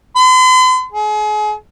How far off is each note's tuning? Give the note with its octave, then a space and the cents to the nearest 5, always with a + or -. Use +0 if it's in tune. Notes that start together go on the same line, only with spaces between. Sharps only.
C6 -45
G#4 +35